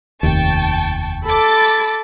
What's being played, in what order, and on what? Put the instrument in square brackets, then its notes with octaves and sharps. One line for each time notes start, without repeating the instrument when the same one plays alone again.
[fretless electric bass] F1 D#2 [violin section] G5 A5 C#6
[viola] A4 [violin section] B5 D6 A6